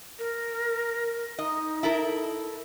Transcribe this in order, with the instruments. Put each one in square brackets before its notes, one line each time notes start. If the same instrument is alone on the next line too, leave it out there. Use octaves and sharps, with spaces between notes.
[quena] A#4
[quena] D#4 [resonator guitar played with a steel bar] D#5
[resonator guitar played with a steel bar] E4 A4 A#4